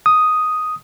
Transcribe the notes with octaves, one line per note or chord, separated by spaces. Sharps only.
D#6